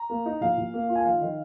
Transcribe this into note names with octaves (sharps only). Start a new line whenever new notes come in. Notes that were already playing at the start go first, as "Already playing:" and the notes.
Already playing: A#5
A#3
D#4
A#2 F5
A#2
A#3
F4
G#5
D#3 F5
D#3